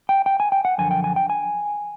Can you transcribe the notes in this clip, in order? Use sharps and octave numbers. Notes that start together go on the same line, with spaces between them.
G5
G5
G#5
G5
F#5
F#2 D3 F3 G#5
G5
G#5
G5
G#5